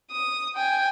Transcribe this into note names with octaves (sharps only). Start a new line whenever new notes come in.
D#6
G5 G#5